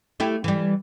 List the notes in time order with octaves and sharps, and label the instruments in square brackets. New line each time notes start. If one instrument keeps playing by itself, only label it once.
[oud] A3 E4 G4
E3 G3